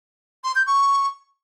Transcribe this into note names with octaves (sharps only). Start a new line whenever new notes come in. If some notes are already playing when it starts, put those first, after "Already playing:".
C6
G6
C#6